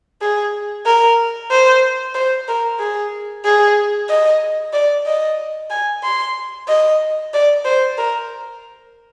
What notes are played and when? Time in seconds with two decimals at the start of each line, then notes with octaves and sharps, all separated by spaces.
0.21 G#4
0.86 A#4
1.51 C5
2.14 C5
2.48 A#4
2.80 G#4
3.45 G#4
4.09 D#5
4.73 D5
5.06 D#5
5.71 G#5
6.03 C6
6.68 D#5
7.33 D5
7.65 C5
7.98 A#4